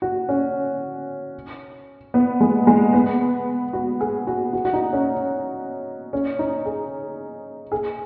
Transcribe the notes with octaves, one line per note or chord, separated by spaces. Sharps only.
F#4
C#4
B3
G#3
G#3
B3
F#4
G#4
F#4
F#4
F#4
D#4
C#4
C#4
D#4
G#4
G#4